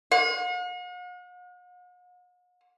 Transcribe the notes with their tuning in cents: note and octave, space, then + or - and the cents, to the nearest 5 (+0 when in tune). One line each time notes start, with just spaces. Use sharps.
F#5 -45